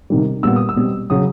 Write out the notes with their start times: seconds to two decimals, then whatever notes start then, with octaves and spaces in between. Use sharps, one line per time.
0.10 C3 D#3 G3
0.43 A#2 G3 B3 E6
0.56 D#6
0.69 E6
0.76 B2 G3 C4
1.10 C#3 F#3 D#6